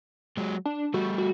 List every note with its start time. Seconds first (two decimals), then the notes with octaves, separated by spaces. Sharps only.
0.37 F#3 G#3
0.65 D4
0.94 G3 A3 F#4
1.18 F#4